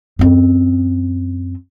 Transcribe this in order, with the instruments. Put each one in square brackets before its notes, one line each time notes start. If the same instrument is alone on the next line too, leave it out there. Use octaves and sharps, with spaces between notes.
[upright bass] F#2 C4